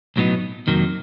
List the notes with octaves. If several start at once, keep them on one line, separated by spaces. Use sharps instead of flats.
B1 A2 F#3 B3 D#4
F2 C3 D#3 F#3 A#3